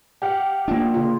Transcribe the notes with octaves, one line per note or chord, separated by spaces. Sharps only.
G4 F5 F#5
A#3 D4 F4
C#3 F4